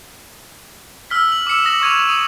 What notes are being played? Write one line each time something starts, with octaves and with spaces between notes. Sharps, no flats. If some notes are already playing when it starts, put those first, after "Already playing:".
E6 F6 B6
F#7
D6 E6 C#7 E7
D#6 A#6 F#7
C#6 G#6 D#7 F7
D#6 D#7